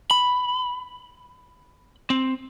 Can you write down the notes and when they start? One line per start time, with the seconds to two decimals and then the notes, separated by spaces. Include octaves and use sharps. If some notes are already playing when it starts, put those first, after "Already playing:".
0.11 B5
2.10 C4